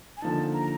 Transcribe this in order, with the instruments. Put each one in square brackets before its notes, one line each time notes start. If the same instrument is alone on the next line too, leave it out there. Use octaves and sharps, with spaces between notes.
[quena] G#5
[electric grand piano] D3 F3 A#3 D#4 [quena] A5
[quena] A#5